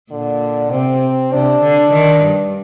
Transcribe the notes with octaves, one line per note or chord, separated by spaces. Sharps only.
A#2 D3
C3 C4
C3 D4
D3
D#3
G2